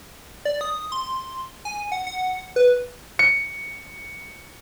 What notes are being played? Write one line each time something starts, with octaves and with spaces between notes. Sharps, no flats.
D5
D#6
C6
G#5
F#5
F#5
B4
C#7